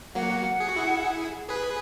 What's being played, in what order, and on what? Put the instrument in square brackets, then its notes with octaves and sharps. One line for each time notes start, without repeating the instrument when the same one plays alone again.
[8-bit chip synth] F#3 A#3 [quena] F#5
[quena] F#5
[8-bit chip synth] G#4
F#4
E4 G#4
G#4 B4